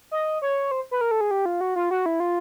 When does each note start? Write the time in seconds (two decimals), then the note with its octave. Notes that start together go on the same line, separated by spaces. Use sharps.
0.11 D#5
0.42 C#5
0.71 C5
0.91 B4
1.01 A#4
1.11 A4
1.21 G#4
1.31 G4
1.46 F4
1.61 F#4
1.76 F4
1.91 F#4
2.06 E4
2.20 F4